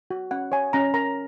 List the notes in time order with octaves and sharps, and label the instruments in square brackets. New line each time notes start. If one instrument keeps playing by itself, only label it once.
[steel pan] F#4
C#4 F#5
C#5 G#5
C#4 A#5
A#4 A#5